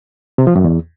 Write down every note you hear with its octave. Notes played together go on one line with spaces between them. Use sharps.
C3
F3
F#2
E2